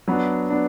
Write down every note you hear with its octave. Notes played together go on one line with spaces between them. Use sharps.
F#3 B3 D4
B3 D4